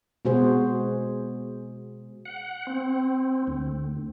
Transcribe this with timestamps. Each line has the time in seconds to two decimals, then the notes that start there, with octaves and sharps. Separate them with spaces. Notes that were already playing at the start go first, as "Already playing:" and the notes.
0.25 B2 G#3 F#4 G#4 C5
2.25 F#5
2.67 C4
3.47 D2